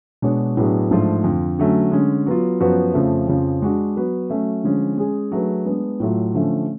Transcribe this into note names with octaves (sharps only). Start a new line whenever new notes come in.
B2 G#3 D4 F#4 C#5
A2 F#3 B3 D4 G#4
G#2 F3 A3 D4 F4
F2 D3 F3
D3 F#3 A3 C#4
D3 G#3 C#4
F#3 B3 F4
F#2 F3 B3 F#4 B4
F2 C#3 F3 A3
F2 C#3 F3
G#3 D4 F#4
F#3 B3 F#4 B4
F#3 A3 C#4
D3 F3 G#3 C#4
G#3 C#4 G#4
F#3 A3 D4 G#4 B4
G#3 B3 D4
A2 F#3 A3 F4
D3 F3 A3 C#4